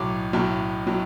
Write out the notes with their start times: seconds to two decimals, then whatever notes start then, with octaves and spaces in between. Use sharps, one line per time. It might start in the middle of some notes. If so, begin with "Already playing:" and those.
Already playing: B1 A2 F#3 D6
0.33 B1 A2 F#3
0.87 A2 F#3